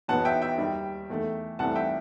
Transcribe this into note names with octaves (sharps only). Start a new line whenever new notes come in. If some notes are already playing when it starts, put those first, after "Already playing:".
E2 B2 F#3 B3 F#5 A5
E5 G5
E5 G5
D#2 D#3 G3
E2 D#3 A3
C2 C3 E3 A3 C4 F#5 A5
E5 G5